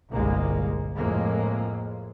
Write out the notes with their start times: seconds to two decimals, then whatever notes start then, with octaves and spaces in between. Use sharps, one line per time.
0.10 G1 C2 A#2 G#3 A#3
0.96 F2 A2 G#3 A#3